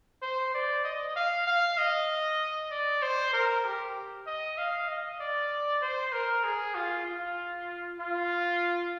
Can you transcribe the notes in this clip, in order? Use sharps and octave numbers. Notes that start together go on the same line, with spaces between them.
C5
D5
D#5
F5
F5
D#5
D5
C5
A#4
G4
D#5
F5
D#5
D5
C5
A#4
G#4
F4
F4
F4